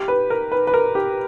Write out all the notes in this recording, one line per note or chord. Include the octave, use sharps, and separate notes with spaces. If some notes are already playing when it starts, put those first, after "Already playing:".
Already playing: G4
B4
A#4
B4
B4
A#4
G4